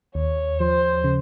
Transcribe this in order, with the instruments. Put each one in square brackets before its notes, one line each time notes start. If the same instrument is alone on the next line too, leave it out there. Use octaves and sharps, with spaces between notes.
[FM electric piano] D#2 [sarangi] C#5
[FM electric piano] F3 [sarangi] C5
[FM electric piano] C#3